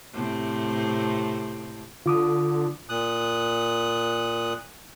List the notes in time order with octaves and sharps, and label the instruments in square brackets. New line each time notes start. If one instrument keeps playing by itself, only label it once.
[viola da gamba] A2 C3 C4
[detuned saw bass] D3 [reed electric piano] F4 D6 D#6
[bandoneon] A#2 D#6 F#6